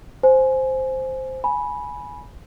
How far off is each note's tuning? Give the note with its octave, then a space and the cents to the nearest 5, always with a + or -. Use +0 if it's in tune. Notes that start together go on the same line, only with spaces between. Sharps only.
C5 +0 G#5 +15
G#5 +10 B5 -10